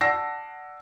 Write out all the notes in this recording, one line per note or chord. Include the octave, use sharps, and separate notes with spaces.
D5 F#5 A5 E6 A#6 C7